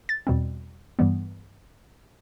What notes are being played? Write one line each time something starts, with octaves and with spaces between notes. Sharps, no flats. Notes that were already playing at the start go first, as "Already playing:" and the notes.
A6
E2 B2 G3 C4
G2 E3 G3 B3